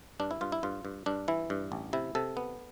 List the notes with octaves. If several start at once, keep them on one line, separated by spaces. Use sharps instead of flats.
G2 D4
E4
G2 F4
E4
G2 F4
G2
G2 D4
E3 E4
G2
A1
C3 E4
C3 A4
B3